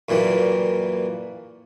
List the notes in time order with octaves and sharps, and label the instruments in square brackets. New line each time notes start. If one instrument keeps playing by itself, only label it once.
[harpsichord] F#2 A#2 E3 G3 A#3